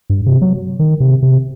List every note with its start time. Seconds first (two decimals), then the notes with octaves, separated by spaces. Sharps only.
0.10 G2
0.26 C3
0.42 F#3
0.79 D#3
1.00 C3
1.23 C3